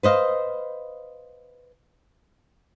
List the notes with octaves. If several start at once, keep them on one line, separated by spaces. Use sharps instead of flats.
B4 C5 D#5 F5